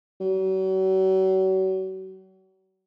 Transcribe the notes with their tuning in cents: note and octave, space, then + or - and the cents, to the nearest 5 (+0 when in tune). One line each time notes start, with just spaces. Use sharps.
F#3 +40